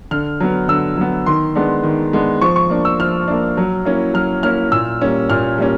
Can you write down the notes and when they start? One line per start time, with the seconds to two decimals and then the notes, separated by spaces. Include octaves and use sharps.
0.11 D3 F6
0.40 F#3 B3
0.68 D3 E6
0.97 F#3 B3
1.26 D#3 C6
1.55 G#3 B3 D4
1.83 D#3
2.13 G#3 B3 D4
2.42 F3 C#6
2.56 C#6
2.70 A#3 D4
2.85 E6
2.99 F3 F6
3.28 A#3 D4
3.57 F#3
3.85 A#3 C#4 E4
4.14 F#3 F6
4.43 A#3 C#4 E4 F6
4.72 A#2 E6
5.01 G3 A#3 C#4
5.30 A#2 F6
5.58 G3 A#3 C#4